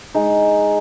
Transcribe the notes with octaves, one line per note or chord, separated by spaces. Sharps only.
G#3 D#4